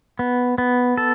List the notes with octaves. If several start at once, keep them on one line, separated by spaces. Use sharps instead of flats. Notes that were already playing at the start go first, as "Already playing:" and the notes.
B3
B3
A4